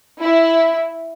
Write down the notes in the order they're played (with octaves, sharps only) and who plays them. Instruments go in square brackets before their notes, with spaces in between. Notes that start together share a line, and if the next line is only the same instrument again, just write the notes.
[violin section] E4